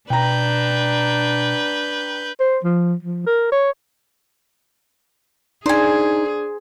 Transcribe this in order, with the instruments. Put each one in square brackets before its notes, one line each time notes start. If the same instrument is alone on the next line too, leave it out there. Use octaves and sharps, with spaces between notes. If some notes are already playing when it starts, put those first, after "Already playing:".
[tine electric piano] B2 [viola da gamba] D4 [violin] B4 G6 [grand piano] G5 A#5
[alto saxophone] C5
F3
F3
A#4
C#5
[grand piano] D4 [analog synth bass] D#4 [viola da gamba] G#4 [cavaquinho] C5 G#5